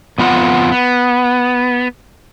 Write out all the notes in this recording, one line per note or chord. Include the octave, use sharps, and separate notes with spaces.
F2 B3 F4 F#5
B3